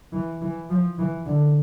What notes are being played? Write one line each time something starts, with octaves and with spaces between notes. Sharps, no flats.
E3
E3
F3
E3
D3